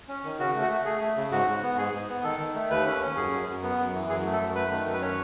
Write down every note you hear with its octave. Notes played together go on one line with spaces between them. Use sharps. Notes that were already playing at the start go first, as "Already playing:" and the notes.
C#4
D#3
C#3 F#4
A3
F#4
A3
A3 G#4
A3
C#3
G#2 F#4
G#2
B3
G#2 G#4
G#2
B3
D#3 A4
D#3
A3
D#2 B4
C#4
C#4
F#2 G#4
F#2
F#2
B3
F#2
E3
F#2 G#4
A3
A4
F#2
A3 B4
D#3
F#2
B4
C#4 C#5